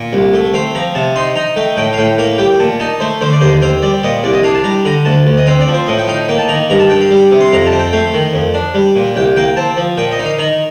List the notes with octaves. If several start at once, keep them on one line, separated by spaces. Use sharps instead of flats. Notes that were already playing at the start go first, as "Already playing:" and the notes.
Already playing: A#2
C2
A3
C4 F5
F3 A#5
C3 A5
D#4 C6
D#4 A#5
A3 G5
A2 G5
F5
A2 G5
A#3 F5
G3 G5
A#2 A5
D#4 A5
A3 C5
D3 C5
D5
D#2 C5
C4 F5
G3 D5
A#2 D#5
C2 D5
D#5
D4 F5
A5
G3 A#5
D3 A#5
D2 A5
D2
D#5
C4 F5
D5
F3
C5
A2 D#5
G5
D#4 F5
A#3 G5
A5
D#3 A#5
G2 A#5
A5
G2 G5
F5
G3
C3
C6
F2 A#5
A5
C4
G5
A3 F5
D#3
F2
D4
G3
A#2
C2 G5
A#3 G5
C4 A5
F3
A#2 G5
D#5
D#4
F5
D#3 A#5